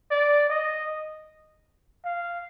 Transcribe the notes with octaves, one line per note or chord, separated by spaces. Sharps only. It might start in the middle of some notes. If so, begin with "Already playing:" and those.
D5
D#5
F5